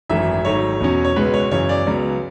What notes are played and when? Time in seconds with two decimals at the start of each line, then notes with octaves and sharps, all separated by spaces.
0.10 G#1 F#2 E3 A3 E5
0.45 G#1 G#2 F#3 A3 C#5
0.80 E2 B2 F#3 C#4
1.05 C#5
1.16 C#2 B2 G#3 B4
1.34 C#5
1.51 F#2 C#3 E3 C#5
1.69 D5
1.87 C#2 C#3 F#3 B3